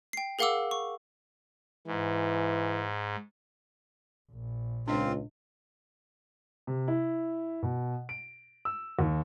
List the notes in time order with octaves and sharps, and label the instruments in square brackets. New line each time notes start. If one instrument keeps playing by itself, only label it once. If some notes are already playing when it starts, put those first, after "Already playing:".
[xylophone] G5 C7
G#4 A#4 F5 F#5 D6 E6
C#6
[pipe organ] G#2 [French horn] E3
[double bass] A#1
[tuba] C#2 [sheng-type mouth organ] C4 F4 [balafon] D4 D#5
[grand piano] C3
E4
B2
D7
E6
D#2